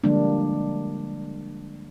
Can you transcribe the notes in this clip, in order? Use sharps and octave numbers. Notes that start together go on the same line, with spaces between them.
D3 F3 G3 G#3 A#3 D4